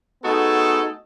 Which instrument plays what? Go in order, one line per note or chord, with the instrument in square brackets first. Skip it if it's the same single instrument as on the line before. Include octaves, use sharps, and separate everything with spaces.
[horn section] A3 B3 D#4 F#4 G#4 A4